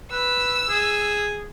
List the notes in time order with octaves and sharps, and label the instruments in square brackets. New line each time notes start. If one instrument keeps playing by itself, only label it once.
[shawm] B4 [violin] E6
[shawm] G#4